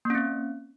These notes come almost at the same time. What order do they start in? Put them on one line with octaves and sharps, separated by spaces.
A#3 C#4 C4